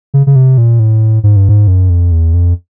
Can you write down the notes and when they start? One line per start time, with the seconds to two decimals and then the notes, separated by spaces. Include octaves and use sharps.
0.14 C#3
0.27 C#3
0.36 C3
0.58 A#2
0.79 A2
1.23 G#2
1.36 G2
1.49 G#2
1.67 F#2
1.90 F2
2.12 E2
2.34 F2